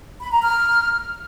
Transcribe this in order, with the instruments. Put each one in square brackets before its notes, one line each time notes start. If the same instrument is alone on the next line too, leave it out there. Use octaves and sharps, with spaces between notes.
[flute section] B5
A#5
F6